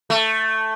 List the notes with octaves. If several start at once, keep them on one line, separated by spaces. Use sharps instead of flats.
A3